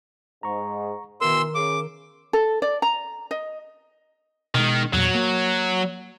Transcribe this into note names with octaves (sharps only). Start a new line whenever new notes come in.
G#2 A#5 C#6
B2 D#3 E3 A#4 C6 E6
C#3 D6
A4
D5
A#5
D#5
B2 D#3 G#3
E2 A#2 F#3
A#3